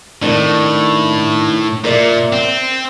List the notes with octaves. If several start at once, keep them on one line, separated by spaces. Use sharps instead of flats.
A2 D#3 C4 D4
A#2 A#4 D5 E5
C4